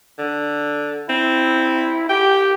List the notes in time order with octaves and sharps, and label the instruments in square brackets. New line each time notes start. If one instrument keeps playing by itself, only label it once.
[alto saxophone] D3
[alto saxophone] C4 [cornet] E4
[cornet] G4 [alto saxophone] G5